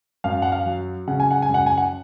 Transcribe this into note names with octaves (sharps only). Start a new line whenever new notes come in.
F#2 F5
F#5
F5
F#3
C#3 F#5
G#5
F#5
G#5
F#2 F#5
G#5
F#5